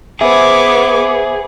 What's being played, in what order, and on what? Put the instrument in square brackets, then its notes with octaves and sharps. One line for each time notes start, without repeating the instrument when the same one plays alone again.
[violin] B3 [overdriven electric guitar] G#4 [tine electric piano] C5 E5 [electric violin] D6 G#6